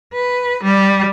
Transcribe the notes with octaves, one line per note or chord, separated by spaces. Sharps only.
B4
G3